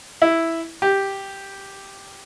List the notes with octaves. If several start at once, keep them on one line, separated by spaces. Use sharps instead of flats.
E4
G4